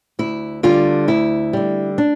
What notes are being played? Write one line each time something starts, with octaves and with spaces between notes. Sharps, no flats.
D2 E4
D3 G3 F4
D2 E4
D3 G3
D4